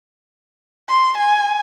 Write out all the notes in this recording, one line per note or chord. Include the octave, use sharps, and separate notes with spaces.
C6
G#5